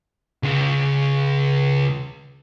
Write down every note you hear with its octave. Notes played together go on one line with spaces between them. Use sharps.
C#2 C#3